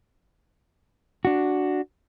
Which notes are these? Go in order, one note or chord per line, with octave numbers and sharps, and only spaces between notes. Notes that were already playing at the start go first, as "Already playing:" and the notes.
D4 F#4